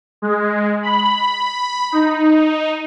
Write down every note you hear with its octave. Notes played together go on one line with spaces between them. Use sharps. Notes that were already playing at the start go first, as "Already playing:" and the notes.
G#3
B5
D#4